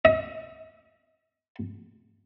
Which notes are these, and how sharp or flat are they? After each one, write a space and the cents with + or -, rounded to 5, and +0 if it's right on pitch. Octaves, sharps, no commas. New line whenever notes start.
D#5 +40